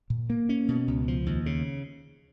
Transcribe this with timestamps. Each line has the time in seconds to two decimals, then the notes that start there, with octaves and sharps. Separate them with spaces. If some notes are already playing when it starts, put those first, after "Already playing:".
0.10 A#2
0.30 A#3
0.49 C#4
0.68 B2
0.88 C#2
1.08 F3
1.26 D#2
1.46 C#3